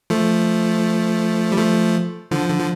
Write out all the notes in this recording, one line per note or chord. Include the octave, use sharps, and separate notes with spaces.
F3 A3
G3
F3 A3
D3 F3
D3
F3